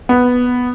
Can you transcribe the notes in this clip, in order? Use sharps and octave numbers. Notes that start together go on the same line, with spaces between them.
B3